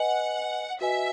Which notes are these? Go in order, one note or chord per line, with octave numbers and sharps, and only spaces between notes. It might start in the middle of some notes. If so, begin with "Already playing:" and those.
Already playing: B4 D#5 F#5 G#5
F#4 B4 D#5 E5 G#5